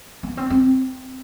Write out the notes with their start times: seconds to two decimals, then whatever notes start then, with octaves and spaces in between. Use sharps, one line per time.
0.23 B3
0.37 C4
0.50 C4